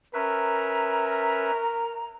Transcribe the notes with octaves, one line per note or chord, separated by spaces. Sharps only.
C#4 A#4 B4 E5 A#5